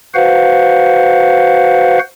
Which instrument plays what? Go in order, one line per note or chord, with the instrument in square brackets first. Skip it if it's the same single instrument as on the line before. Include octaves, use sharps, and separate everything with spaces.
[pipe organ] F#4 B4 C5 F5 F#5